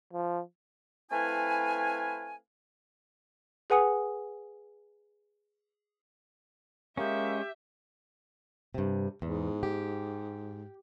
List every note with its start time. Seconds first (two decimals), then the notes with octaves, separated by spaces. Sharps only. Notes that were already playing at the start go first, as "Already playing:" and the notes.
0.13 F3
1.11 A3 C4 E4 B4 F5 G#5
3.70 G#4 B4 F#5 G#5 D#6 C#7
6.97 G#3 A#3 C#4 G4 E5
8.74 G2 C3
9.22 E2 G#2
9.63 G4